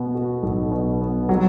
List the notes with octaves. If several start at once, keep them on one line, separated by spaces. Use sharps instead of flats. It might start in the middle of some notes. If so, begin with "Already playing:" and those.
Already playing: B2 B3
F#4
B1
B2
B3
F#3